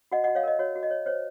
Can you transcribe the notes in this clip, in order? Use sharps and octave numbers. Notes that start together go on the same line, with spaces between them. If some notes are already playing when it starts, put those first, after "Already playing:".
F#4 D#5 F#5
F#4 D#5 F#5
C#5 F5
A#4 D#5
F#4 C#5
F#4
D#5
C#5
C5 C#5